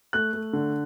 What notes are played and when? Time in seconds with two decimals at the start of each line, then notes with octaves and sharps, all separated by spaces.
0.13 A3 F#6
0.33 A3
0.53 D3